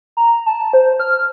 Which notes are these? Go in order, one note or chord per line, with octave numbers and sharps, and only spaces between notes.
A#5
A5
C5
F6